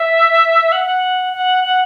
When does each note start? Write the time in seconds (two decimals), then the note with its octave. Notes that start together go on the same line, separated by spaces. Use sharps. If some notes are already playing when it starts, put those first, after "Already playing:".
Already playing: E5
0.72 F#5
1.33 F#5
1.64 F#5